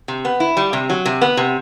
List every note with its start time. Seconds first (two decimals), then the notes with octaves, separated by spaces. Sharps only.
0.08 C3
0.25 B3
0.40 E4
0.57 G3
0.73 C3
0.90 F#3
1.06 C3
1.21 B3
1.37 C3